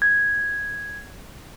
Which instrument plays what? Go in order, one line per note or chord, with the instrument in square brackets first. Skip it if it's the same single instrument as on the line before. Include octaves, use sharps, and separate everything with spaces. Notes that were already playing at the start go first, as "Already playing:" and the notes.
[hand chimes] G#6